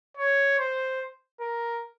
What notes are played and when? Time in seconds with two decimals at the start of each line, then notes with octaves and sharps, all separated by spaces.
0.17 C#5
0.59 C5
1.41 A#4